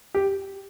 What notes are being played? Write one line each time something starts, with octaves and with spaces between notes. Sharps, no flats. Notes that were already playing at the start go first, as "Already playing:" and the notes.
G4